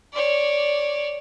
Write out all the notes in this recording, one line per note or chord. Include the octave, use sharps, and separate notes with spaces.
C#5 D5